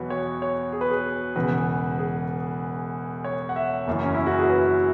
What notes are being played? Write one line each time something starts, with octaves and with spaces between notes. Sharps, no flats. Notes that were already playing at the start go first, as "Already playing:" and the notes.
Already playing: E2 B2 F#3 B4 C#5
C#5
C#5
G#4
B4
G#4
E1 E2 C#3 B4
G#4
C#5
F#5
E5
F#1 F#2 E3
C#4
E4
F#4
G#4
B4